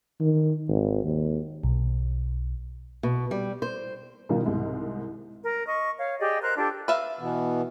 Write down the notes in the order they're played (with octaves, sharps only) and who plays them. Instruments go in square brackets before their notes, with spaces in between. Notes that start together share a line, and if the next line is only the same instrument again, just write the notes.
[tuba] D#3
G#1
D#2
[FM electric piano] B1
[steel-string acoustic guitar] B2
G3
C5
[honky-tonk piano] B2 D#3 G3 D#4 F4 A#4
C2 G#2
[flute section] A#4
D#5 C#6
C#5 F5
G4 G#4 D5 D#5
A#4 C5 A#5 F#6
D4 F4 G4 A4
[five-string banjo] B4 E5 F5
[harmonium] B2 E3 B3